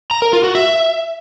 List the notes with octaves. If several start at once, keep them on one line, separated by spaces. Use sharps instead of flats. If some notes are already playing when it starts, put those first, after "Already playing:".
A#5
A#4
F4
F#4
E5